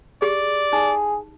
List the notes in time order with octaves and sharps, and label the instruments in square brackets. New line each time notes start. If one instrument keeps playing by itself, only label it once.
[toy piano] G4 G#4 [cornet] D5
[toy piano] D#4 [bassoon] G#4